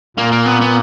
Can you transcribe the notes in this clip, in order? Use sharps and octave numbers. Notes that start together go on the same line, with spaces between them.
A#2 A#3
A#3
B3
B3